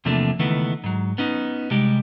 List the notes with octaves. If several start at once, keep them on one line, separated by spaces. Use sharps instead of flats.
E2 C3 F3 A3 A#3 D4
C#2 D#3 E3 A3 B3
G#2 F#3
B3 C#4 D#4
C3 G3 G#3 G4